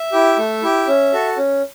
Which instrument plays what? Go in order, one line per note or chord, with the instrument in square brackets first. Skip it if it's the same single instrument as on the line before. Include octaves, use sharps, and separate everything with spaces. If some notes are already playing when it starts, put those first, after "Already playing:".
Already playing: [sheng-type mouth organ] E5
E4 G4
A3
E4 G4
C#4
F#4 A4
C#4